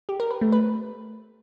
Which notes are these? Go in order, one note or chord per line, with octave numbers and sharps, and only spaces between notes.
G4
A#4
B4
A3
B4